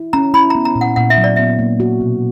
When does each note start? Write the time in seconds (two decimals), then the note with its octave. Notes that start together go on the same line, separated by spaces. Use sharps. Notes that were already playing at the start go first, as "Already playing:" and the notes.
Already playing: E4
0.13 C#4 A#5
0.34 E4 B5
0.50 B3 A#5
0.65 A#5
0.75 A#2
0.81 F#5
0.96 A#2 F#5
1.10 E5
1.17 F#3
1.24 D5
1.36 B3 E5
1.59 A#3
1.80 F#4
2.01 B2